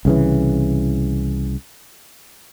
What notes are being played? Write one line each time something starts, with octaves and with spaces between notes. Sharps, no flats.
C2 C#3 E3